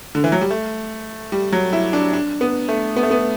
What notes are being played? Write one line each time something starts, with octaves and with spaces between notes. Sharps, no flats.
D3
E3
F#3
G3
A3
G3
F#3
E4
D4
D4
B3
A3
B3
A3
B3